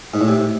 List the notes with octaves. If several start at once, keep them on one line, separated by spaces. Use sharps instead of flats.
G#2
A2
C3